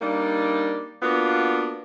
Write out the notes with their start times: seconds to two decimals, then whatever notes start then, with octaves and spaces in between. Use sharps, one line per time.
0.02 G3 A#3 D4 D#4 D5
1.02 A#3 B3 D4 F4 F#4